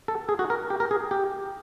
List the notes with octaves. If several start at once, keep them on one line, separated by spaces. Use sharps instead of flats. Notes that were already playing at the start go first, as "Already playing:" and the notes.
A4
G#4
F#4
A#4
G4
A#4
G#4
G4